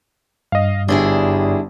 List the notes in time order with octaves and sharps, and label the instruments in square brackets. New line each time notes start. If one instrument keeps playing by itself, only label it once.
[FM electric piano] G2 [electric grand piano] D#5 F5
[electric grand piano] G1 [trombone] G3 [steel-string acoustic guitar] D4 E4 G#4